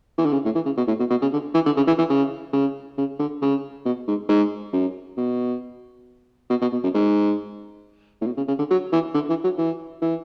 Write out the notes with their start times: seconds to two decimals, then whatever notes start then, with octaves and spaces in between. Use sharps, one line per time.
0.18 E3
0.25 D3
0.33 C#3
0.45 A2
0.55 E3
0.66 C#3
0.77 B2
0.88 A2
0.99 B2
1.10 B2
1.22 C#3
1.33 D3
1.54 E3
1.66 D3
1.77 C#3
1.87 E3
1.98 E3
2.10 C#3
2.53 C#3
2.98 C#3
3.19 D3
3.41 C#3
3.85 B2
4.08 G#2
4.29 G#2
4.73 F#2
5.17 B2
6.50 B2
6.61 B2
6.72 B2
6.83 F#2
6.95 G#2
8.21 A2
8.26 B2
8.37 C#3
8.48 C#3
8.59 D3
8.70 F#3
8.92 E3
9.14 D3
9.29 E3
9.44 F#3
9.58 E3
10.02 E3